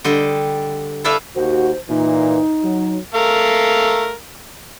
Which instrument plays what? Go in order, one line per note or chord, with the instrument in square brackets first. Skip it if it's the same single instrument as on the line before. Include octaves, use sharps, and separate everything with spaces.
[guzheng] D3 G3 D#5 C6
E4 A4 B4 D5 E5 F5
[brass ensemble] D#2 F#4 [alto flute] C5
[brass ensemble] A#2 E3 [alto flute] D#4
[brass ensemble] F#3
[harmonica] A3 A#4 F5